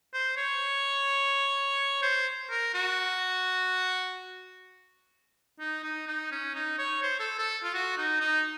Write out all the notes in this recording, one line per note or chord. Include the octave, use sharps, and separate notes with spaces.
C5
C#5
C5
A#4
F#4
D#4
D#4
D#4
C#4
D#4
C#5
C5
A4
A4
F4
F#4
D#4
D#4